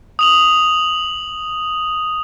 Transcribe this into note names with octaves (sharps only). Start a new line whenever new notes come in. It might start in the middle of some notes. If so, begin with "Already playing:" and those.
D#6 F7 F#7